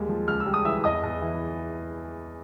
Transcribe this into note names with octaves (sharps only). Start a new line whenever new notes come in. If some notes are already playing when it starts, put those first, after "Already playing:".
Already playing: D#2 G3 G#3
F3
C#2 F6
E6
G3
D#6
E3 E5 E6
E2 D#5 D#6
E2
E3